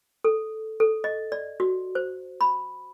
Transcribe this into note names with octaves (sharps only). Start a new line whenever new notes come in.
A4
A4
D#5
D5
F#4
C5
B5